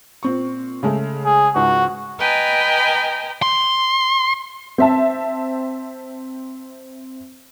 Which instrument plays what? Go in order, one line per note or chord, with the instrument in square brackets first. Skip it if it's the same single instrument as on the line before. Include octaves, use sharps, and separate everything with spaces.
[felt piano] A#2 C4 C#6
C#3 G#3 A3
[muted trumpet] G#4
[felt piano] C#2 G#2 [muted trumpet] F#4
[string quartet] B4 D#5 G5 G#5 A#5
[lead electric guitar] C6
[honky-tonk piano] C4 E5 A5